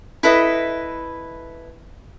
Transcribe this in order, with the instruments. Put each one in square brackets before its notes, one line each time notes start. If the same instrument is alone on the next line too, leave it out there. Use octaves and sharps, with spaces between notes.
[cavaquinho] E4 A4 B4 D#5